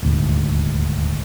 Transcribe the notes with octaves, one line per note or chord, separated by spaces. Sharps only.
D#1 D2 G#2